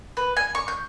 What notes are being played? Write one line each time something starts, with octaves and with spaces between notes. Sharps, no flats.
B4
G#5
C#6
G6